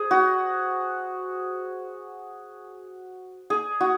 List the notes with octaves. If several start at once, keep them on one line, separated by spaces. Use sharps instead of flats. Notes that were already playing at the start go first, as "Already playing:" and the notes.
Already playing: G#4 C5
F#4
G#4
F#4